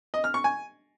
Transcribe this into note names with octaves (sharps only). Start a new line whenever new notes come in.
D#5
F6
C#6
G#5